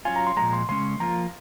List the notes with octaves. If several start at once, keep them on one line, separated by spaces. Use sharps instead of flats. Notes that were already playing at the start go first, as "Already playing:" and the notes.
F#3 C#4 F4 G#5
A#5
C6
A#2 F3 G#3 A#5
C6
C#3 G#3 C#4 C6
F3 A#3 F4 A#5